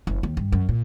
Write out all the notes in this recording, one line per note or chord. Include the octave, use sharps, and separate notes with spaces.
F#1
D#2
G2
F#2
A#2